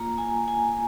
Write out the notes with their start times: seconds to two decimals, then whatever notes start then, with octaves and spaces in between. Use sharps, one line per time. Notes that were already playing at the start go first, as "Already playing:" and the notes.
Already playing: A#3 F4 A#5
0.18 G#5
0.48 G#5